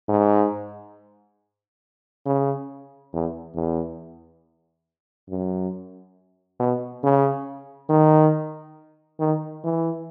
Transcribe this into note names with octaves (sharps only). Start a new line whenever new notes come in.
G#2
C#3
E2
E2
F#2
B2
C#3
D#3
D#3
E3